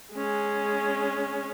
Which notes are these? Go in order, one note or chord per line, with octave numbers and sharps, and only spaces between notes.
G#3 C#4